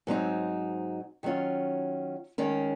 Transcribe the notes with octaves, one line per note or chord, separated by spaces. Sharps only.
G#2 F#3 C4 D#4
D#3 F#3 C#4 F4
D#3 G#3 C#4